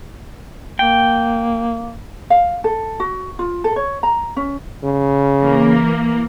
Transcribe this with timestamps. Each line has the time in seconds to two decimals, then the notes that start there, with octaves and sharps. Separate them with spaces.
0.79 A#3 G5
2.30 F5
2.64 A4
3.00 F#4
3.39 F4
3.64 A4
3.76 C#5
4.03 A#5
4.36 C#4
4.83 C#3
5.40 E3 A#3